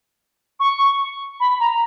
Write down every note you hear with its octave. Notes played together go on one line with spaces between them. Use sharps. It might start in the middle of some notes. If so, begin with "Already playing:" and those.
C#6
B5
A#5